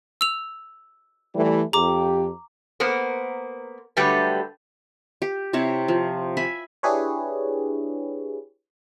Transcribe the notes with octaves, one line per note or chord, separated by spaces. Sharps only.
E6 F7
E3 G3 A3
F2 G4 A#5 D6
A#3 B3 A#4 C5
D3 F#3 G3 A3 G4 B4
G4
C3 C4 E4 C#5
F3
E5 G#5 B5
D4 E4 G4 G#4 B4 C#5